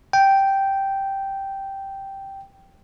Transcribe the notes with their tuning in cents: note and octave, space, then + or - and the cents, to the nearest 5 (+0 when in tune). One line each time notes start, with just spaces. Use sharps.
G5 -5